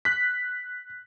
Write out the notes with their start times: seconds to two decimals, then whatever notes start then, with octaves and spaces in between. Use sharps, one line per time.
0.05 F#6 B6